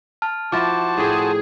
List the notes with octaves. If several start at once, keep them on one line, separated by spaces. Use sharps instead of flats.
A5 F6
F3 E4 F#4 C5 A5 D6 A6
A2 G#4 G5